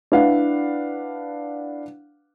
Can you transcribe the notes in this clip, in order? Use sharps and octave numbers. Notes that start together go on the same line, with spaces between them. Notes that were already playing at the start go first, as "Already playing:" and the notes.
D4 E4 B4 F5 F#5